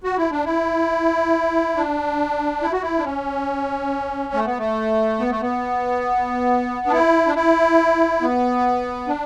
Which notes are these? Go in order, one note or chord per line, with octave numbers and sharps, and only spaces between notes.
F#4
E4
D4
E4
D4
E4
F#4
E4
D4
C#4
A3
B3
A3
B3
A3
B3
D4
E4
D4
E4
B3
D4